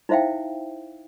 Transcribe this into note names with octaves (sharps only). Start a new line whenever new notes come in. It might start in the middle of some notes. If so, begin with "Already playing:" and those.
D#4 E4 C5 E5 F5 G5